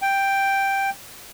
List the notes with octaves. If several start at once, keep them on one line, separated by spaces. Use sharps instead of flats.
G5